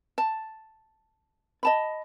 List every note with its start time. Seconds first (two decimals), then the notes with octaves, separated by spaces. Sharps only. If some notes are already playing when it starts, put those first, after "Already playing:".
0.18 A5
1.63 D#5 A5 B5